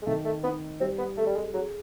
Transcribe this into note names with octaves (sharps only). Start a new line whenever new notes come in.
G#3
D#3 A3
A3
B3 D#4
G3 C4
B3
A3 A4
G3
G#3
F#3 G#4